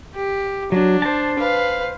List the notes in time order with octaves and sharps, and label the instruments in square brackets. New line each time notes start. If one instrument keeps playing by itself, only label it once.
[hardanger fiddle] G4
[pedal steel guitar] F#3 [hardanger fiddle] D4
[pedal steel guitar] C5 A5
[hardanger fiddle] B4 F5